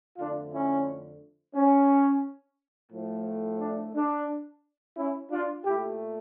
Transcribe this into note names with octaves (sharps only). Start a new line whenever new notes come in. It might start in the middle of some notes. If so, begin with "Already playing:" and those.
F2 D3 A3 D4 F4
C#4 E4
C#4
A2 F3 A3
D4
D4
C#4 E4
D4 F4
A#2 A3 E4 G4